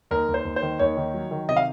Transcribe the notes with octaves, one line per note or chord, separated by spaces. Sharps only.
D#2 A#4
D#2
C5
D#2
C5
D#3
D#2 C#5
D#3
F#3
D#3
C3 D#5
F5